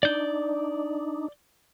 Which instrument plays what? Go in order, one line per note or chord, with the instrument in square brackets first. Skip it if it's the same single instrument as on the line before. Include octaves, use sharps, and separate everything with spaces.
[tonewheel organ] D4 D#4 [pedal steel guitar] D5 G6